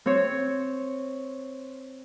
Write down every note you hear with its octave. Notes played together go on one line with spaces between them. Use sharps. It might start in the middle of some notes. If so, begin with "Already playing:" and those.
C4 C#5